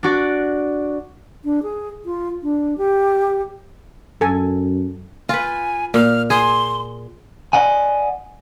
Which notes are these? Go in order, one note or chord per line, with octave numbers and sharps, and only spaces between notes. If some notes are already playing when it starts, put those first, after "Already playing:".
D4 F#4 D5
D4
G#4
F4
D4
G4
F#2 A4 G#5
F4 B4 G#5
A#2 F6
G#4 C6
D5 D#5 F#5 G#5